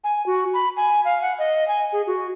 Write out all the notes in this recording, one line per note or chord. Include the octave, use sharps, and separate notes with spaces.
G#5
F#4
B5
G#5
F5
F#5
D#5
G#5
G#4
F#4